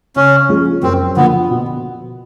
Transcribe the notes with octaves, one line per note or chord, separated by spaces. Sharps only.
C#3 C#4
F3 G#3 C#4
F#2 C4
D3 F3 A#3 B3
B2